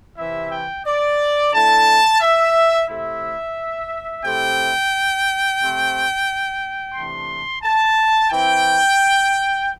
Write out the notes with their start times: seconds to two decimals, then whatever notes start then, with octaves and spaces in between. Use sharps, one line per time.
0.18 C3 E3 C4 E4 E5
0.52 G5
0.85 D5
1.53 D3 A3 E4 A5
2.21 E5
2.88 C3 A3 C4 E4 E5
4.24 C3 A3 C4 E4 G5
5.59 C3 A3 C4
6.95 C3 E3 A3 D4 C6
7.62 A5
8.30 E3 C4 E4 G5